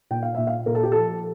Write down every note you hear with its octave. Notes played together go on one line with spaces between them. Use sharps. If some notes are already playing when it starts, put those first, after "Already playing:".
A#2 G5
F5
A#2 E5
F5
A#2 A#4
A4
G4
F3 A4